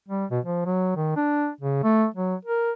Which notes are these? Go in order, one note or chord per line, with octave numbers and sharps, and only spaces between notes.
G3
B2
F3
F#3
D#3
D4
C#3
A3
F#3
A#4